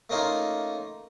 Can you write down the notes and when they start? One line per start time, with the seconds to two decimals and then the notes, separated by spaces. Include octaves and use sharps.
0.10 A3 A#3 C#4 D#4 F4